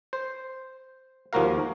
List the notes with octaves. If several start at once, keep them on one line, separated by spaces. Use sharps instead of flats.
C5
D#2 F3 A#3 F#4 A#4 F5